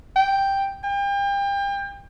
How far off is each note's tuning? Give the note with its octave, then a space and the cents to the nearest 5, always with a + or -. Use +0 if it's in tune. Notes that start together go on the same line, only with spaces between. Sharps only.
G5 +0
G5 +35